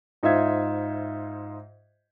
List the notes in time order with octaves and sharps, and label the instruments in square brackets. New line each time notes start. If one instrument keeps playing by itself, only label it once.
[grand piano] G#2 D#4 F4 C5 E5 G#6